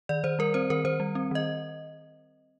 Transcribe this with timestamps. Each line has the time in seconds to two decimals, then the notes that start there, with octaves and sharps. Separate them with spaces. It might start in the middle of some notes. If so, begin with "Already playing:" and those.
0.09 D#3 D5
0.24 D#3 C5
0.39 G3 A#4
0.54 C4 C5
0.70 D#3 A#4
0.84 D#3 C5
1.00 G3
1.15 C4
1.31 D#3 D#5